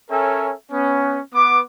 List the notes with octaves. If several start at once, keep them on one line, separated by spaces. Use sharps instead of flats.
C#4 A4 A#4 C#5 E5 G#5
B3 C#4
B3 D6